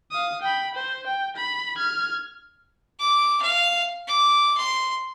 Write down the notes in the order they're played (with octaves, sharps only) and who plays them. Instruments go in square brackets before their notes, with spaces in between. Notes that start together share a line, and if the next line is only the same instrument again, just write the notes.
[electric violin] F5 D#6
G5 B5
C5
G5
B5
F6 G#6
[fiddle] D6
F5
D6
C6